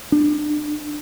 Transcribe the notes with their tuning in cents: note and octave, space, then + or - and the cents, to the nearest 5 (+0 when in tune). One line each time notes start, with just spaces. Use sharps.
D4 +30